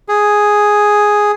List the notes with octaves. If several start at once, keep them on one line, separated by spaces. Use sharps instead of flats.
G#4